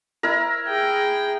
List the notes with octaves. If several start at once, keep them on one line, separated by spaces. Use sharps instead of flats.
E4 A#4
G#4 G5